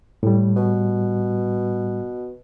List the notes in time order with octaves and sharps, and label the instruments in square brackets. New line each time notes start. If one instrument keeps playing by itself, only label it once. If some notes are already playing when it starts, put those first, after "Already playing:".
[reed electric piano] A2 G3
[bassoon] B2